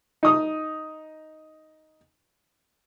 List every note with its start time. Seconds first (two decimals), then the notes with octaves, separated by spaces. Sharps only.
0.23 D#4 D#6